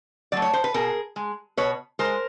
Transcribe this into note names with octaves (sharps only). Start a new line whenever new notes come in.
F#3 A3 D5
C#5
C5
B4
B2 G#4 A#4
G#3
B2 B4 C#5
G#3 A#4 C5